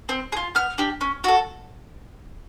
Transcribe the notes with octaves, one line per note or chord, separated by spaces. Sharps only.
C4
G#4
F4
B3 F6
D4 G4
C#4
F#4 A4